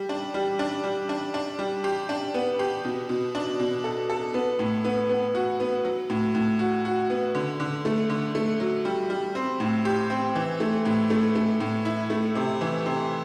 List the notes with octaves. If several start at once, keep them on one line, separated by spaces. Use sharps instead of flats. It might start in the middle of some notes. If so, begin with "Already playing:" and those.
Already playing: G3
D4
G3
D4
G3
D4
D4
G3
G4
D4
B3
G4
B2
B2
D4
B2
A4
A4
B3
A2
B3
B3
F#4
B3
F#3
A2
A2
F#4
F#4
B3
D3
D3
A3
D3
A3
F#3
G3
G3
C4
A2
G4
C4
E3
A3
A2
A3
A3
A2
E4
A3
C3
E3
C3